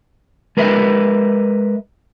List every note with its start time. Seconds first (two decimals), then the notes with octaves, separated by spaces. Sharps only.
0.57 G#3 A#4 B4 D#5 E5